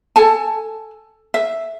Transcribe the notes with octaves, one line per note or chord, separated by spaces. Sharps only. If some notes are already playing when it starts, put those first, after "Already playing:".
A4 G#5 A5
E5